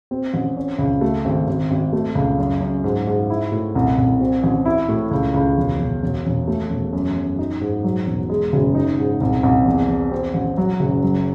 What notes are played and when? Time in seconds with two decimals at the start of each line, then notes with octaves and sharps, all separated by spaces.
0.11 C4
0.34 A1
0.57 C#4
0.79 C#2
1.01 A3
1.25 G#1
1.47 G#1
1.71 G#1
1.93 A3
2.15 C#2
2.38 F#2
2.61 F#2
2.84 G#2
3.07 G#2
3.30 E4
3.52 A2
3.75 C2
3.98 C2
4.20 C4
4.44 A1
4.65 E4
4.89 A2
5.11 C#2
5.34 C#2
5.57 E1
5.80 E1
6.02 E1
6.26 E1
6.48 A3
6.70 E1
6.93 F#2
7.16 F#2
7.39 D#4
7.61 G#2
7.84 F#3
8.07 E1
8.29 G#3
8.53 F#1
8.75 D#4
8.98 G#2
9.21 C2
9.43 C2
9.66 E2
9.88 E2
10.11 C4
10.34 A1
10.57 F#3
10.80 F#1
11.03 F#3